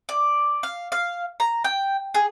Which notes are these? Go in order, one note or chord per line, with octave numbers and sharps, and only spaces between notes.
D5
F5
F5
A#5
G5
G#4